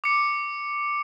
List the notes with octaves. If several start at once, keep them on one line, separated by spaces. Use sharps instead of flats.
D6 C#7